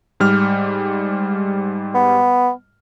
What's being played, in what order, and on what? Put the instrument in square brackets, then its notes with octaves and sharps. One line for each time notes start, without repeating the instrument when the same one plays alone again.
[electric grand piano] G#2 G3 F6
[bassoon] B3